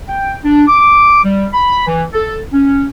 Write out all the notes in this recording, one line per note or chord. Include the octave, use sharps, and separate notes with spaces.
G5
D4
D6
G3
B5
E3
A4
C#4